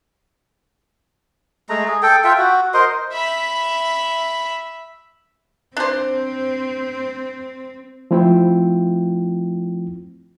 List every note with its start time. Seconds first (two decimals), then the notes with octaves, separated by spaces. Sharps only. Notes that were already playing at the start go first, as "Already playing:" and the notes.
1.69 G#3 A3 A#5
1.88 G#4
2.03 A4 G5
2.24 F4 E5 G5
2.38 F#4
2.74 A#4 C5 D#5 C6
3.12 E5 B5
5.77 C4 D4 C5
8.11 F3 A3 C4 E4 F4 G5